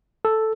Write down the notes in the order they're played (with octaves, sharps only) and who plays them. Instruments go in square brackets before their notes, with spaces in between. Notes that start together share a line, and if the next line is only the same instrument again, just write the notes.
[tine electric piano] A4